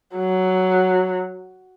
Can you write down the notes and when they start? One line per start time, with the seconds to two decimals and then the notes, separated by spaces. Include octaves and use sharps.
0.16 F#3